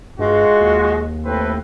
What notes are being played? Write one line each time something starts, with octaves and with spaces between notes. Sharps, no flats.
G2 G#3 F4 F#4
D#2
A2 C4 B4